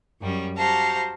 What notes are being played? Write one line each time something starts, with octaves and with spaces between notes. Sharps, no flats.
F#2 G3 C#4
F#4 G4 C5 F5 A5 A#5